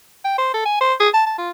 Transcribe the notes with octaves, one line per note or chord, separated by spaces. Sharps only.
G5
C5
A4
G#5
C5
G#4
A5
A5
F4